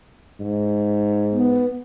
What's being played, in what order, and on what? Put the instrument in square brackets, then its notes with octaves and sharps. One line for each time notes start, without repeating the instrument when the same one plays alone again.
[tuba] G#2
[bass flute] B3